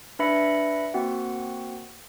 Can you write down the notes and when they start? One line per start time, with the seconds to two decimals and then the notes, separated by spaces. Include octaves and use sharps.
0.19 D4 B4 E5 B5 A#6 C#7
0.94 A#3 C4 F#4 F#5 G5